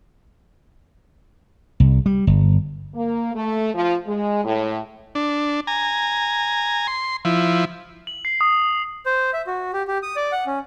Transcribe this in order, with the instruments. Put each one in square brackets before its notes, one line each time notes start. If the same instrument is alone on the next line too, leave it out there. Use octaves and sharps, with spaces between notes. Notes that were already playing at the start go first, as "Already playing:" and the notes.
[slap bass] C2
G3
G1
[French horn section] A#3
A3
F3
G#3
A2
[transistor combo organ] D4
G#5 A#5
C6
F3 E4
[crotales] F#7
C7
D#6
[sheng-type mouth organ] C5
E5
F#4
G4
G4
D#6
D5
F#5
C#4